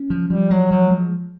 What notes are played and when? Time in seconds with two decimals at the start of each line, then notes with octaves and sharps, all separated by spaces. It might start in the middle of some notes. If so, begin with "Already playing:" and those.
Already playing: C#4
0.10 F3
0.30 F3 G3
0.51 F#3 G#3
0.71 F3 F#3
0.90 G#3